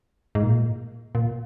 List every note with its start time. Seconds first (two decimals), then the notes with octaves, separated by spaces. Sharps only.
0.35 G#2
0.43 A#2
1.15 A#2